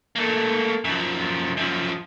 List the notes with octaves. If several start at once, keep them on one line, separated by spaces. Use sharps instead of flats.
A3 A#3
F#2 F3
F#2 F3